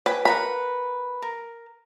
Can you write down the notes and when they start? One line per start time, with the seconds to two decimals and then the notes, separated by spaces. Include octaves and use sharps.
0.06 B4 G5 G#5 B5
0.25 A#4 B4 F#5 B5
1.22 A#4